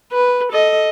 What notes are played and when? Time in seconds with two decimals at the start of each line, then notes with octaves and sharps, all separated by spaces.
0.13 B4
0.52 A4 D#5